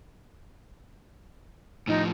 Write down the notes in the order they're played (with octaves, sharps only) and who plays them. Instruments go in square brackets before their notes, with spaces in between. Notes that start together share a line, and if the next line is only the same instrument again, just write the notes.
[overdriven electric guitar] A2 F3 [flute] D#4